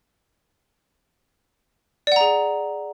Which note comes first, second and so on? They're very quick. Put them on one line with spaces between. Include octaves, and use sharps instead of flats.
D5 F#5 A#5 G#4